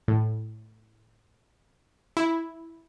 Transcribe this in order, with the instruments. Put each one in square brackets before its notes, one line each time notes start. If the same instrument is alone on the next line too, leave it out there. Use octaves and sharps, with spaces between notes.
[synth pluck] A2
E4